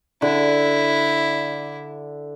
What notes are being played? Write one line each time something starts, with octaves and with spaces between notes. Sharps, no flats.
D3 E4